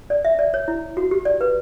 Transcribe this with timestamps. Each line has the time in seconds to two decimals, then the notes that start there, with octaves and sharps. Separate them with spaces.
0.10 D5
0.25 E5
0.39 D5
0.54 C#5
0.68 E4
0.97 F#4
1.11 G4
1.25 D5
1.41 B4